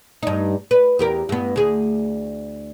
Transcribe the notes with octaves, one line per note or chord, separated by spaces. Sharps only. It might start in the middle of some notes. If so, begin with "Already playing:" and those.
G2 D#4
B4
E2 G4 A#4
G2 B3
D2 G#4